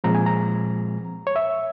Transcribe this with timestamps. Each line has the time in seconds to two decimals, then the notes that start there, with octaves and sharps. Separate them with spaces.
0.04 A#2 F3 G#3 C4 A#5
0.15 G#5
0.26 A#5
1.27 C#5
1.36 E5